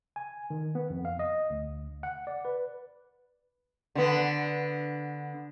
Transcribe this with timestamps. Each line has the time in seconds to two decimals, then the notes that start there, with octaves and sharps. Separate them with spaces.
0.16 G#5
0.50 D#3
0.75 B3
0.90 F2
1.05 F5
1.19 D#5
1.50 D2
2.03 F#5
2.27 D5
2.45 B4
3.95 D3 B3